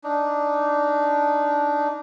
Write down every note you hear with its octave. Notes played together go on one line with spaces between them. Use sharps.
D4 D#4